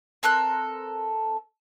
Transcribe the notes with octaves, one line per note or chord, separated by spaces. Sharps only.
C4 A4 A#4 F#6